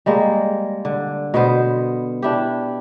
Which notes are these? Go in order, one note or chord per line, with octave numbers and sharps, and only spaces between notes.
G3 G#3 A#3
D3
B2 B3 C5
D4 E4 G4